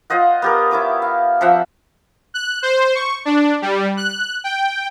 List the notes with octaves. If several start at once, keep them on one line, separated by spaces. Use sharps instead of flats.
F4 C5 D#5 F#5
B3 G4 A#4
E4 C#5 D6 D#6
F5
F3 C4 E5 F#5
F#6
C5
C#6
D4
G3
F#6
G5